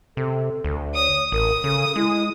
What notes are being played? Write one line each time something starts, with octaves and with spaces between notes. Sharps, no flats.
C3 A4
D2
C#5 D#6
A1 A#4 D#6
C#3 A4
G#3 E4